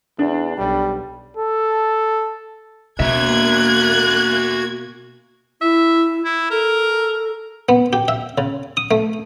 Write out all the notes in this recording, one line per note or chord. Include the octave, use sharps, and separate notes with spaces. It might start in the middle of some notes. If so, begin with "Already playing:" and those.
E2 D4
B1 G3
A4
B2 A#3 F#4 E5 F#6 G#6
E4 E5
E4
A4 A#4
B3
G4
E5
C#3
D#6
A3